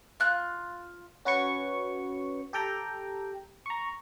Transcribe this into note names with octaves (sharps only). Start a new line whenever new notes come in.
F4 F#6
C#4 F#4 B4 C#5 C#6
G4 A4 G5 A#5
A#5 C#6